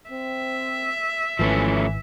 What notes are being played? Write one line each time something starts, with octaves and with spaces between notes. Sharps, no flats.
C4 E5
G#1 E3 F3 A3 C#4